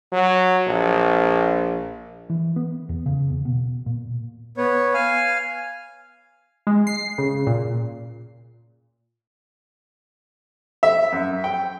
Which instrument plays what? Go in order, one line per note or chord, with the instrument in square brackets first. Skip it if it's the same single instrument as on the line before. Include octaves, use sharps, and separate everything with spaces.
[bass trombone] F#3
A#1
[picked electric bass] E3
B3
E2
C#3
E2
B2
A#2
[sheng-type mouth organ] B3 C#5
F5 G#5
[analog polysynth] G#3
C7
C#3
A#2
[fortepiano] E5
F#2
G5